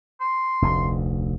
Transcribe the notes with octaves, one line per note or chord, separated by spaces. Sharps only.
C6
F1 D2